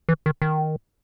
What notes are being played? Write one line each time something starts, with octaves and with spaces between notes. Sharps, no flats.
E3
D#3
D#3